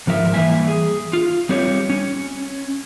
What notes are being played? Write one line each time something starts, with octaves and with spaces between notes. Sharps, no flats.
G#2 F3 A#4 E5
E3 G3 A#3 E5 G#5
G#4
F4
G3 C4 G4 C#5
C#4